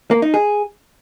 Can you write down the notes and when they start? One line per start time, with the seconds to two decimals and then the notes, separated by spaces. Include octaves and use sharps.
0.11 A#3
0.22 D#4
0.34 G#4